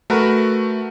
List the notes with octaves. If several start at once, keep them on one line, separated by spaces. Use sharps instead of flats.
A3 F#4 A#4 B4